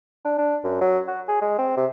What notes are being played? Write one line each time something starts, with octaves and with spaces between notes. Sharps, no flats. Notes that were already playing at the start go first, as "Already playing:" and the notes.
D4
D4
F#2
F#3
F#4
G#4
G#3
C4
C3